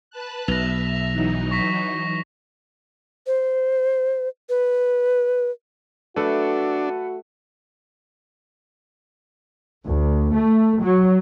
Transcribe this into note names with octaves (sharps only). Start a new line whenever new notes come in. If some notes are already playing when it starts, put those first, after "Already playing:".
B4 A5 F#6
B1 E5 A#6 F7
E3 F#3 D#4
C#6 A#6 B6
C5
B4
A3 D4 F#4 A4 B4
D2
A3
F#3